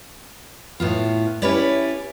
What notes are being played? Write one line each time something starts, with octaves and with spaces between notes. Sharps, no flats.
A2 B3 F4
C#4 E4 G4 B4 C#5 D5